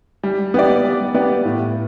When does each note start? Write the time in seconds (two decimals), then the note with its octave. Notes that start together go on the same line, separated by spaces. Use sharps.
0.23 G3
0.54 B3 G4 D5
0.84 G3
1.14 B3 G4 D5
1.45 A2